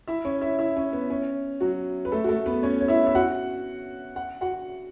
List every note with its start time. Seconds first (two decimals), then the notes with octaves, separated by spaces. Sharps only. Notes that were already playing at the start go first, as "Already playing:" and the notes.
0.08 E4 E5
0.25 C#4 C#5
0.41 E4 E5
0.59 E4 E5
0.76 C#4
0.93 B3
1.10 C#4
1.60 F#3 F#4
2.05 B4
2.12 A3 A4
2.24 F#4
2.29 A3 A4
2.46 B3 B4
2.63 C#4 C#5
2.81 C#5
2.88 E4 E5
3.07 E5
3.15 F#4 F#5
4.16 F#5
4.41 F#4 F#5